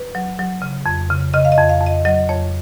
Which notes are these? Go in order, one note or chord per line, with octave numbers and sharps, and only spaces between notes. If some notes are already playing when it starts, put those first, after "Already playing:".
Already playing: B4
F#3
F#3
C#3
F2
C#3
C#3 D#5
F5
D#5
F2
F5
F2
D#5
F#3 D#5
F2 C#5